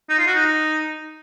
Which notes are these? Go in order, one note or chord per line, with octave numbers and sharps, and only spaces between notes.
D#4
F4
F#4
D#4